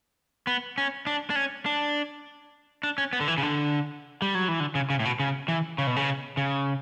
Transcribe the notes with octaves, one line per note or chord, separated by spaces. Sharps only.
B3
C#4
D4
D4
C#4
D4
D4
C#4
B3
D3
E3
C#3
D3
G3
F#3
E3
D3
C#3
C#3
A2
B2
C#3
E3
C#3
B2
C#3
C#3